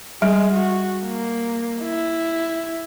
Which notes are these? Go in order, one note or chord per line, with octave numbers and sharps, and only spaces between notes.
G3 G#3
F#4
A#3
E4